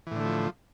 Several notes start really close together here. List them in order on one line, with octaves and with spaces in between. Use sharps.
E3 A2 D3 A3 F3